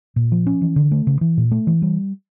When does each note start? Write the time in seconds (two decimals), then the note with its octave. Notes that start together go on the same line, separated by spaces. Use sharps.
0.16 A#2
0.32 F3
0.47 C#4
0.61 E3
0.76 D3
0.91 A3
1.07 C#3
1.21 E3
1.37 A#2
1.51 A3
1.67 E3
1.82 G3